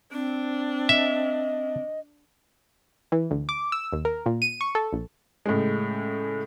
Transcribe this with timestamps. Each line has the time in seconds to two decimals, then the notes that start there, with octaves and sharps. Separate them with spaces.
0.12 C4 D4
0.89 D#5 E5
3.12 E3
3.31 D2
3.49 D6
3.72 E6
3.93 D#2
4.05 A#4
4.26 A#2
4.42 D#7
4.61 C#6
4.75 A4
4.93 A#1
5.46 A2 C#3 G#3